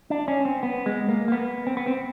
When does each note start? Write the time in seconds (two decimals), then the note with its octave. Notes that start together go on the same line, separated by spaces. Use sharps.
0.10 D4
0.28 C#4
0.45 C4
0.63 B3
0.86 G#3
1.09 A#3
1.28 A#3
1.32 B3
1.67 C4
1.77 B3
1.87 C4